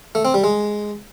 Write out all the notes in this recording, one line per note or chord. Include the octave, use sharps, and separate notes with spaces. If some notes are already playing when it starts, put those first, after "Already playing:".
A3
C4
G3
G#3